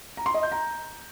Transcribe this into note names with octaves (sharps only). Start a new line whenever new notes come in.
A#5
C6
D#5
G6
A#5